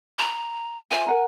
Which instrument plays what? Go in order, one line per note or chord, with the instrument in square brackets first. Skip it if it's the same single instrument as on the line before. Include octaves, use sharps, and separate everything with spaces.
[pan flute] A#5
[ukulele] F4 C5 E5 [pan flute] G#5
[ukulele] A#4 F#5 A#5